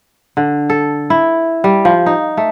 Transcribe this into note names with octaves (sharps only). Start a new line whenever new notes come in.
D3
A4
E4
G3
F3
D#4
A3